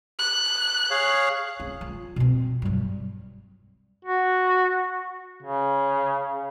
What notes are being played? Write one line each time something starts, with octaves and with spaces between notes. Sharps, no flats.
F#6
G#4 C#5 F5
C#4
F4
B2 C4
G2 F#3
F#4
C#3